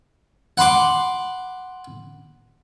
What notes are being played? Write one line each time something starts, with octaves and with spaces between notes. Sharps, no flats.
F#5 B5 C6 D6